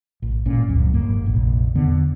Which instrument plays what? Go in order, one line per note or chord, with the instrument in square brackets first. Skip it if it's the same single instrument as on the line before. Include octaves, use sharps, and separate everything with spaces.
[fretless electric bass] A1
G#1 A#2 C#4
D#1 C#2 F#2 F3
G1 G#2 A#3
F1 A#1
E2 D3 B3